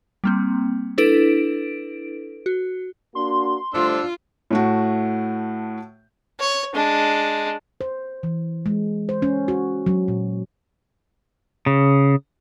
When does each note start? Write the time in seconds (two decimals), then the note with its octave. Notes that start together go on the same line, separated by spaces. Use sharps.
0.24 G3 A#3 C4
0.98 D4 E4 A4 B4 D7
2.46 F#4
3.15 A#3 D4 F#4 C6
3.74 G3 A3 D4 F4 C5 E6
4.51 A2 A3 F#4
6.39 C#5
6.74 G#3 D4
7.81 C5
8.23 E3
8.66 G#3
9.09 C5
9.22 C#4
9.48 F#4
9.86 F#3
10.08 A#2
11.66 C#3